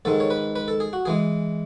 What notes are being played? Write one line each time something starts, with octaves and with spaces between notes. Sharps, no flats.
G#2 D#3 G#3 A4
C#5
B4
B4
A4
G#4
F#4
E3 G#3 G#4